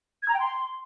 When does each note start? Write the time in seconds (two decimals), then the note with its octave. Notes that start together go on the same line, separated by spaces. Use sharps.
0.22 G#6
0.28 A#5
0.34 G5
0.40 C6